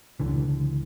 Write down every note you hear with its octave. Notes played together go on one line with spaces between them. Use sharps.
C#2 D3 E3